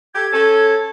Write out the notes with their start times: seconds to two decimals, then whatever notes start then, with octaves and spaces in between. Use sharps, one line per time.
0.15 G4 A4 G#6
0.33 C#4 A4